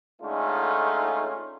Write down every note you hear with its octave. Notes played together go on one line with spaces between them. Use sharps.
D3 G#3 A3 C#4 D#4 F4